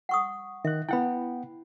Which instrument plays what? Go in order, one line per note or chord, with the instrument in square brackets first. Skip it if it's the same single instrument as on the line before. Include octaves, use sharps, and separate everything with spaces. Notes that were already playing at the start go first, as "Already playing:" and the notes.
[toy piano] F#5 C#6 D#6
[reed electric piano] D#3 F#6 [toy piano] E5
[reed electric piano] B3 F#5 G5 [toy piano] E4 B5